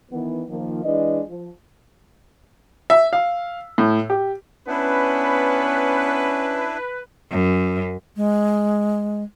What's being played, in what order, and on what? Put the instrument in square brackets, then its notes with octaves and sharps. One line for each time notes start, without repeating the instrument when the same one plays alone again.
[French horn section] D#3 E3 B3
D#3 F3 A#3
E3 G#3 D4 D#5
F3
[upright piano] E5
F5
A2
G4
[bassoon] B3 [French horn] C#4 [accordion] D4 E4 [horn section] B4
[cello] F#2
[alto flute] G#3